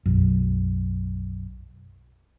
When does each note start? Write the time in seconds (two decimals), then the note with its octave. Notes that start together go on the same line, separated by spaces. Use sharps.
0.06 B1 F#2